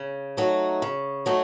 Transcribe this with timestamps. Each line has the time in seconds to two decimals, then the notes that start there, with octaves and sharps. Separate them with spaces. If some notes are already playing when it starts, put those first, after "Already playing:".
Already playing: C#3
0.37 F#3 A3 D#4 F#4
0.82 C#3
1.26 F#3 A3 D#4 F#4